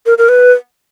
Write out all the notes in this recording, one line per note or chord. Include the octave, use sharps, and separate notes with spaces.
A#4
A#4
B4